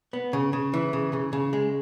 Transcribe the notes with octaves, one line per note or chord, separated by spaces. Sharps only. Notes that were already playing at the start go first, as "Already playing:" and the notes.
B3
C#3
C#3
E3
C#3
C#3
C#3
G#3